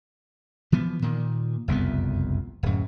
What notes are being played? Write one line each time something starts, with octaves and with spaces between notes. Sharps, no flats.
E3 F3 B3
A#2 D#3
F#1 C2 F2 B3
D1 F#2